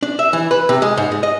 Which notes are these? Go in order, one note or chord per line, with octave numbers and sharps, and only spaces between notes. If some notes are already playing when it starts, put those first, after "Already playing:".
D4
E5
E3
B4
C3
G#3
G#2
G#3
D#5